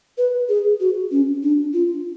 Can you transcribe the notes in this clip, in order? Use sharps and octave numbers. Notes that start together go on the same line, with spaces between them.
B4
G#4
F#4
C#4
D4
F4